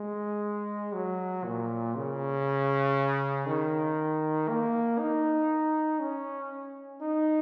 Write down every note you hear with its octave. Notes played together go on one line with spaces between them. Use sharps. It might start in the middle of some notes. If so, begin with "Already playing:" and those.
Already playing: G#3
F#3
A#2
C#3
D#3
A#3
D#4
C#4
D#4